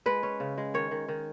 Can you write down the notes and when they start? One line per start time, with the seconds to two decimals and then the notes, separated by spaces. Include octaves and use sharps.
0.06 G#3 B4
0.23 C#4
0.40 C#3
0.58 G#3
0.74 D#3 C#5
0.91 D#3
1.08 D#3